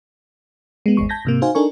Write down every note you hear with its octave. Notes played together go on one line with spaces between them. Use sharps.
G#3 B3
G#1 E2 G#3 C#6
A5 G6 G#6 A#6 B6
G#2 C3 A#3
D#4 F#4 C5 F5 G#5
D4 D#4 A4 A#4 G#5 C#6